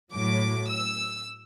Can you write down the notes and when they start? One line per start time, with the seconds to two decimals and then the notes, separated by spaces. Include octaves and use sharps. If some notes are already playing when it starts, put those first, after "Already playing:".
0.13 A2 F#3 D6
0.69 E6